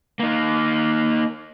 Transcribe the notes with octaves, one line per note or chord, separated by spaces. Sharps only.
A#3 D#4